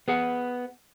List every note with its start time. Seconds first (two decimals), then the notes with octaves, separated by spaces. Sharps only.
0.08 B3 G#4 F#5